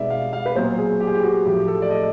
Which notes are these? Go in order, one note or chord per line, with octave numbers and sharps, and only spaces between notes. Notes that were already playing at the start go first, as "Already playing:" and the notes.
Already playing: B2 G#3 B3 D#4 D5 E5
F5
F5
B4
A#2 F#3 B3 C5
G#4
G4
G#4
G4
F#4
A2 F3 A3 G4
A4
D5
D#5